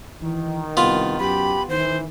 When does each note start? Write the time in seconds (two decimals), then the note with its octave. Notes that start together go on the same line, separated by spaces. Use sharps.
0.22 D#3 E3
0.77 C2 B3 F4
1.19 F#2 G4 B5
1.69 F#2 A2 D#3 E3 C5